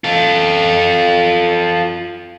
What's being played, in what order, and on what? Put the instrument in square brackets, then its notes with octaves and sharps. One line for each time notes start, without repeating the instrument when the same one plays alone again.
[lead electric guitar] F4 A4